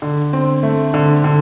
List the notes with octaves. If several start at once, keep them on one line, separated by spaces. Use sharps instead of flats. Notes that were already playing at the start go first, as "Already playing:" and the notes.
D3
C4
A3
D3
D3